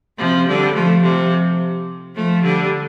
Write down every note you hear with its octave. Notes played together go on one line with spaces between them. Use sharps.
C3 F3
D3 G3
F3 A3
C3 F3
F3 A3
D3 G3